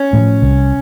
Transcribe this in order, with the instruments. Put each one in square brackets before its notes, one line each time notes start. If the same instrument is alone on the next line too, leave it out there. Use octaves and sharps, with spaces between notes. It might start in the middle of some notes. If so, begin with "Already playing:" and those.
Already playing: [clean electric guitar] C#4
[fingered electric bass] A2 F3
C2